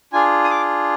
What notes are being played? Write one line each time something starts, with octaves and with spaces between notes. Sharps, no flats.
D4 F4 G#4 G#5
D#6
D6